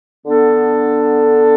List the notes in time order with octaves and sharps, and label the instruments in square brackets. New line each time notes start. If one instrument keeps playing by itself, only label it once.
[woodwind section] D3 B3 D4 A4